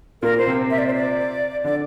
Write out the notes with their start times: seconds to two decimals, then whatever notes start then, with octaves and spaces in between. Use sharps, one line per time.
0.22 A#2 A#3 A#4
0.38 C5
0.47 C3 C4
0.71 E5
0.78 D5
0.87 C5
0.94 D5
1.64 D3 D4 D5